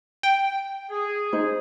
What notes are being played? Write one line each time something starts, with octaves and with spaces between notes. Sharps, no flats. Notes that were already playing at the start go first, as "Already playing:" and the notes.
G5
G#4
D#4 C5